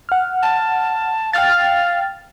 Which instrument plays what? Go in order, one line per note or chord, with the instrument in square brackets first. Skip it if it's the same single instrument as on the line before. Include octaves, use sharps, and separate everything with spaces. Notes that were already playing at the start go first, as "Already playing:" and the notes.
[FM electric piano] F#5 F6
[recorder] A5
[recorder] F5 [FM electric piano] G5 F6 A6